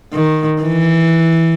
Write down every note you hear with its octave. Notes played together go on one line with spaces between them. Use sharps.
D#3
E3